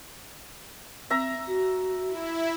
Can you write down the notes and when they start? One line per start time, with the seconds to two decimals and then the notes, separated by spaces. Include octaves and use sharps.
1.10 C4 E5 A#5
1.48 F#4
2.07 E4